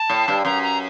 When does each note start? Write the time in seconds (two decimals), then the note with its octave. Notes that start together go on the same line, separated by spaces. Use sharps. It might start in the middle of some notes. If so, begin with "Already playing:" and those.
Already playing: A5
0.10 A2
0.28 G2
0.45 F#2 A#5
0.63 A#5